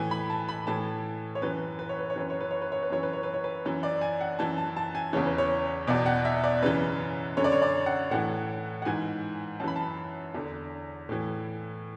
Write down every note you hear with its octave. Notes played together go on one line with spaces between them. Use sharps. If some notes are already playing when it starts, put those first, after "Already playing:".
Already playing: A2 E3 G#5
B5
A5
B5
A2 E3 A5
C#5
F#2 E3 B4
B4
C#5
B4
C#5
F#2 E3 B4
C#5
B4
C#5
B4
C#5
B4
F#2 E3 C#5
B4
C#5
B4
C#5
B4
F#2 E3
D5
G#5
F#5
F#2 E3 A5
A5
A5
G#5
E2 C#3 E3 C#5
B4
C#5
E2 B2 D5
F#5
E5
D5
F#2 C#3 E3 B4
F#2 D3 C#5
D5
C#5
D5
F#5
A2 E3 F#5
F#5
G#2 E3 G#5
F#2 E3 A5 B5
A5
E2 D3
A2 E3